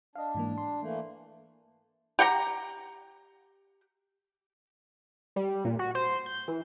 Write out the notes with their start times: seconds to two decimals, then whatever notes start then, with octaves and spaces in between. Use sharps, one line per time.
0.15 D4 D#5 F5
0.35 G#2 E3 A#3
0.58 C6
0.81 E3 A3 A#3
2.19 G4 F#5 G5 A#5
5.36 G3
5.65 A#2
5.79 F#4
5.95 C5
6.26 G6
6.48 E3